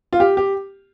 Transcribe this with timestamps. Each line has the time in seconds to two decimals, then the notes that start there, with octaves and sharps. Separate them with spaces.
0.13 F4
0.20 G4
0.37 G4